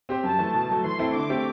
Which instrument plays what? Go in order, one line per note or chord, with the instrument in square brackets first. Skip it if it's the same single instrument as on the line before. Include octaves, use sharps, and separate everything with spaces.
[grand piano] C4 G4 C5
[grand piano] F#2 [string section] A5
[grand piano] E3 A3
B2
F#3 A3
[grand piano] E3 [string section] C6
[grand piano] A3 C4 E4 A4
[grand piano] D3 [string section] D6
[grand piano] A3 C4 G4